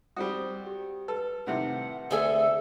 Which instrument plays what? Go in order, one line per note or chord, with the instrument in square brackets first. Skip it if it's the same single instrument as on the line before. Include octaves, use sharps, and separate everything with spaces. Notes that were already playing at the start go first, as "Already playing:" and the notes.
[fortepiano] G3 C4 F#4 [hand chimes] D#6
[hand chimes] G4
[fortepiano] A4 [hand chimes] B4 A5
[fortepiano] A2 C3 D#3 [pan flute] F#5
[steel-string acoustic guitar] D2 G#4 E5 [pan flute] A4